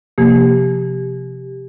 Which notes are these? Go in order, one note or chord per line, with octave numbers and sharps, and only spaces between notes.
C3 F3 A#3 G4